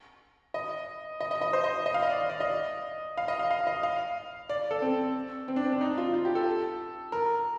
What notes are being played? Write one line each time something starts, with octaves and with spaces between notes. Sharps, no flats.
D#5
D#5
D#5
D#5
C5
D#5
D#5
F5
D#5
D5
D5
D#5
F5
D#5
F5
F5
D#5
F5
D5
A4
C4
C4
D4
C4
D4
D#4
F4
F4
G4
A4
A#4